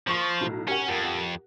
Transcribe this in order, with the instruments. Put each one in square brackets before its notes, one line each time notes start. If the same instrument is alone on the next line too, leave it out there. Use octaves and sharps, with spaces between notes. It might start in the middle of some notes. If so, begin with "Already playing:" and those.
[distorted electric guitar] F3 [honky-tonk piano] C6 C#6 A#6
[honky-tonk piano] B1 A2
[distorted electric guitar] C#4 [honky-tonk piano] G4 A#4 F#5
[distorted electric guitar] F2